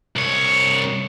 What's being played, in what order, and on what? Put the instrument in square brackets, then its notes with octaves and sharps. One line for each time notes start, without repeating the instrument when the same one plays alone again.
[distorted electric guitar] C2 C#5